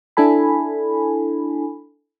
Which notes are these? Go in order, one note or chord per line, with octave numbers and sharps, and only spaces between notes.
D4 E4 A4 G#5 B5